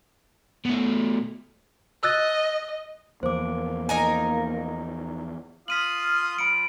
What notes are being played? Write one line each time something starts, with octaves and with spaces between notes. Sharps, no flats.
B2 A3
D#5 E6 F#6 A6
E2 F3 A#3 C5 D6
D#4 A#4 G#5
F4 F5 D#6 F6 B6 D#7 F#7
F3 B5 C#7 D7